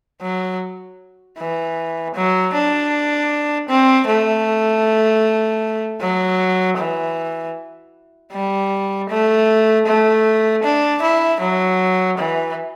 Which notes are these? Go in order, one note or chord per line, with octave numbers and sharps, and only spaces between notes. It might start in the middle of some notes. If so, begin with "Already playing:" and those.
F#3
E3
F#3
D4
C4
A3
F#3
E3
G3
A3
A3
D4
E4
F#3
E3